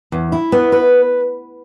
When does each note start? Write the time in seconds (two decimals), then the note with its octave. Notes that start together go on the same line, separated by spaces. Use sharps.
0.12 E2
0.32 E4
0.52 B3
0.72 B4